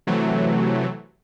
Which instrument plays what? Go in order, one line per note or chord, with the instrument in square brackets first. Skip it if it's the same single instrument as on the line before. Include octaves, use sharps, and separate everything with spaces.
[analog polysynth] C3 E3 F#3 A3